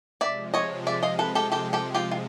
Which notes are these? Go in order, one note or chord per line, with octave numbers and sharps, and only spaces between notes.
C3 F3 G#3 D5 E5
C#5 D#5
D5 E5
D#5 F5
A4 B4
G4 A4
G4 A4
G4 A4
F4 G4
F4